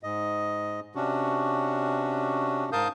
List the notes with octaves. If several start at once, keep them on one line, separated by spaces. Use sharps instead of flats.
G#2 D#5
C3 C#4 D4 F#4
G#2 A#4 F5 A5 D#6 G6